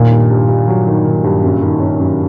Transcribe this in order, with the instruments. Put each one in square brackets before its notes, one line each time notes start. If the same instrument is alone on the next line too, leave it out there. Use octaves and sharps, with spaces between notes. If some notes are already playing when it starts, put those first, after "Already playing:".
Already playing: [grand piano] A#2 [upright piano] D#3
[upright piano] G2
G2
G2
F#3
D#3
D#3
G2
F#2
D#3
C#4
F#2